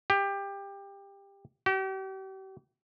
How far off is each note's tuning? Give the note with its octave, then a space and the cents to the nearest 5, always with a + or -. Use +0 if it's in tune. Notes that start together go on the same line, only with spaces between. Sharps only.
G4 +20
G4 -40